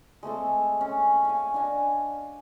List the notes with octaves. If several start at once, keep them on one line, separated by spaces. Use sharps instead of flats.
G#3 A3 C4 A4
C#4
F5 G#5
D4 D#5 G#5